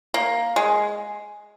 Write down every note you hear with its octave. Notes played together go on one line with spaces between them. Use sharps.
A#3
G#3